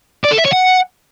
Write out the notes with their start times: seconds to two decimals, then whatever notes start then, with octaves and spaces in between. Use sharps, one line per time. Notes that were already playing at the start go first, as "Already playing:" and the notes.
0.25 D5
0.32 A4
0.39 E5
0.46 C#5
0.53 F#5